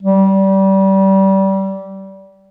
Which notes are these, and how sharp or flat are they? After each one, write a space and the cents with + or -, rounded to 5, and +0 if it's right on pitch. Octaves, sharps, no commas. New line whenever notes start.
G3 -25